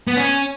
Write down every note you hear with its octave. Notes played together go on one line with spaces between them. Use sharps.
B3
C#4